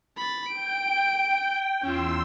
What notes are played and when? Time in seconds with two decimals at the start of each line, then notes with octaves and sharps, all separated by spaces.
0.17 B5 A6
0.48 G5 D7
1.82 E2 C#4 F4 C6 E6